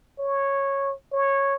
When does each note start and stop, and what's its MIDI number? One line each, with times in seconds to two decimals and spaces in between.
0.19 0.93 73
1.12 1.55 73